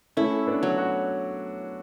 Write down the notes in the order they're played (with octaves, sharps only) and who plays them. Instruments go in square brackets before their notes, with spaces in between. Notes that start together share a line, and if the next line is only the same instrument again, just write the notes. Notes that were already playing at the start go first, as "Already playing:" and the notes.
[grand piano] A3 C#4 [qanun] E4
[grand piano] B3 D4
[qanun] F#3
[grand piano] F#4